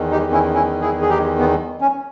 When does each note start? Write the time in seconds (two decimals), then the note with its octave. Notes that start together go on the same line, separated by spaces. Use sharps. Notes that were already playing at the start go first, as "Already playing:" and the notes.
Already playing: E2 D#3
0.11 D#4 G4
0.32 C#4 E4
0.54 C#4 E4
0.81 E4 G#4
1.02 G#4
1.09 D#4 G4
1.39 B3
1.81 C#4